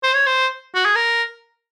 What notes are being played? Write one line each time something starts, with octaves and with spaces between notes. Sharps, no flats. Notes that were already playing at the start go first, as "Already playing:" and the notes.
C5
C#5
C5
F#4
G#4
A#4